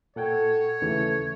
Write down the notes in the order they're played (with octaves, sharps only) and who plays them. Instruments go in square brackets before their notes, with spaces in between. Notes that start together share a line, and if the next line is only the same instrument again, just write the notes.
[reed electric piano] A#2 F#5 G5 [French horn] A4 [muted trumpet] C#5
[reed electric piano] D#2 C#3 E3 [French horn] A3